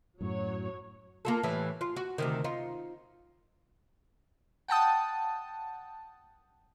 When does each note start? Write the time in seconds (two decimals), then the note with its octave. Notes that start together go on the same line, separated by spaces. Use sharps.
0.21 F#2 A2 F#3 C#5
1.25 A#3 F4 A4
1.43 A2 E3 G3
1.81 F4
1.96 F#4
2.18 D2 C3 D#3
2.44 D#4 F4
4.68 F#5 G5 A5 D#6